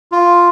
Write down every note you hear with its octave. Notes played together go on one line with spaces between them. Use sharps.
F4